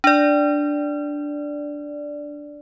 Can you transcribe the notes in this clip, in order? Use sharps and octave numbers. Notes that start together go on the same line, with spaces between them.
D4 D5